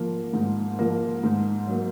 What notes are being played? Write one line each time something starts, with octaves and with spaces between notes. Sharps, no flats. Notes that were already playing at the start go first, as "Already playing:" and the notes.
Already playing: G#2 F3 A#3
G#2
F3 A#3
G#2
F#3 A#3